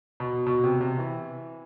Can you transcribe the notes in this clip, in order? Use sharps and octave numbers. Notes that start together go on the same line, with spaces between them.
B2
B2
C3
C3
E3